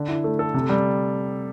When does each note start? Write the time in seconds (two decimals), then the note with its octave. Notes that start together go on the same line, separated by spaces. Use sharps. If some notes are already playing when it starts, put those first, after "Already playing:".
Already playing: D3
0.09 E4
0.24 A3
0.39 A4
0.54 C3
0.69 G3